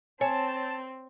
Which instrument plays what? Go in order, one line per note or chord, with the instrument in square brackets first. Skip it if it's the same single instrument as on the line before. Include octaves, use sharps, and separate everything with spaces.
[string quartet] C4 [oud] C#5 [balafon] G#5 [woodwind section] A5